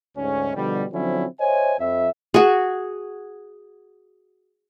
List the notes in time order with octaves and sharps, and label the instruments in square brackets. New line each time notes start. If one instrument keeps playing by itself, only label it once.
[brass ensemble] D2 G#2 C#4
B2 D3 F3 G3
D3 F3 F#3 C4 C#4 E4
C5 C#5 D#5 E5 G#5
F2 E5
[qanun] F#4 G#4